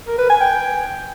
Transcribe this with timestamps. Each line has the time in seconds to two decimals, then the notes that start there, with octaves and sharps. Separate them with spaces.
0.07 A#4
0.18 B4
0.29 G#5
0.40 G5